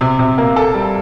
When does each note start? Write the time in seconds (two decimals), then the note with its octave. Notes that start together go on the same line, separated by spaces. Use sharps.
0.01 C3
0.19 C3
0.38 A#3
0.56 A4
0.74 G3